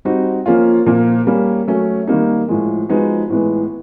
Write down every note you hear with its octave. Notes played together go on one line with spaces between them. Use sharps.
G3 C4 D#4 F#4
F3 A#3 C#4 F4
A#2 F3 A#3
G3 A#3 C#4
F#3 A3 C#4
D#3 G3 A#3 D#4
A2 F3 G#3
F3 G#3 B3 D#4 F#4
A2 E3 G#3 B3